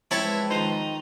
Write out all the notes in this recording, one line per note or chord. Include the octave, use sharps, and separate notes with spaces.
F3 G#3 C4 E4 B4 C#5 A5
D#3 D#4 C5